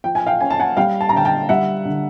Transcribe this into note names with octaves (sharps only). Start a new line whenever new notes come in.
F3 G5
G#5
F5 G5
C#4 G#5
A5
F#5 G#5
G3 F5 G5
A5
A#5
D3 G5 A5
G5 A5
G3 E5 F#5
D3